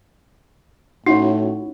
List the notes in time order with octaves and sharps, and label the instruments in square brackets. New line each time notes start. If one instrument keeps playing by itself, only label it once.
[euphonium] A2 [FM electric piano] C#4 E4 F#4 [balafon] D#4